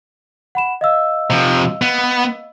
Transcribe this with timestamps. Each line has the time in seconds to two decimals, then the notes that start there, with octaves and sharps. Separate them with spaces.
0.55 F#5 B5 E7
0.81 D#5 F5 E6
1.30 C3 F3
1.82 B3